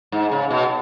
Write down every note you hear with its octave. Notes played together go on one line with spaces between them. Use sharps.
G#2
C#3
B2